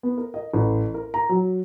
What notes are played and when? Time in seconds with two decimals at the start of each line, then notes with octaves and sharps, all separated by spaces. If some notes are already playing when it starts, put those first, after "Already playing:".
0.03 B3
0.17 A#4
0.34 D#5
0.53 A1
0.94 A#4
1.14 A#5
1.29 F#3